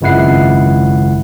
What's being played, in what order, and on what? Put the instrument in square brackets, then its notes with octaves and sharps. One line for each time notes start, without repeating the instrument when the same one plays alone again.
[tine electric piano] G#1 C#2 F#2 E4 F#5 C7